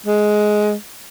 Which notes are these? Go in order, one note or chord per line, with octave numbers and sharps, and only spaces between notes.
G#3